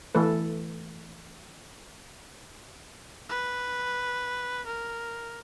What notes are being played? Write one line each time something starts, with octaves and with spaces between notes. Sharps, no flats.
E3 A3 A4 B4
B4
A#4